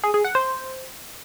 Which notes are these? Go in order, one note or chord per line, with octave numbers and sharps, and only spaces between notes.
G#4
G#4
F#5
C5